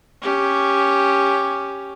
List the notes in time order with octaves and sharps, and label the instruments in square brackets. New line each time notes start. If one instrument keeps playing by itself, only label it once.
[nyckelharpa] C#4 G4